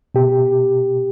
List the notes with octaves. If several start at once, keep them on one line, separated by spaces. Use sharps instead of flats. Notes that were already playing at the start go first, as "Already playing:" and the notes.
B2 G4